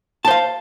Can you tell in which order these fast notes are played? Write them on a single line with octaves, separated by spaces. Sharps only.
A5 C5 F5